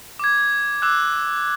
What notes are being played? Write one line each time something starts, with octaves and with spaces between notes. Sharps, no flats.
D6 G#6
D6 E6 F#6